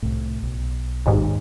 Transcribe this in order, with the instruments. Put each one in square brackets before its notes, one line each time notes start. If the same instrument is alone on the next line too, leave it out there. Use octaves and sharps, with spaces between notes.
[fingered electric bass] C2 A2
B1
[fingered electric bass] G#1 [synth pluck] D#2 G#2